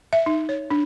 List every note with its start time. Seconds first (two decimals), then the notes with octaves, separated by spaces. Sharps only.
0.13 E5
0.26 D#4
0.49 C#5
0.70 D4